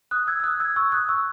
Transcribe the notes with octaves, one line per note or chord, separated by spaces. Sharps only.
D#6 F#6
E6 G#6
E6
D#6 F#6
E6 G#6
C#6 E6
D#6 F#6
C#6 E6